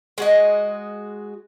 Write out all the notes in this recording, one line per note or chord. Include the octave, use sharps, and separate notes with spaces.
G#3 F#4 D#5